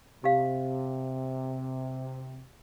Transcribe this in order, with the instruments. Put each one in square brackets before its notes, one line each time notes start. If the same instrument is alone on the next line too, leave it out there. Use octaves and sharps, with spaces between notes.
[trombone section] C3 [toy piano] G4 F5